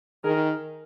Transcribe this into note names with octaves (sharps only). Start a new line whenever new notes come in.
D#3 G#4 A#4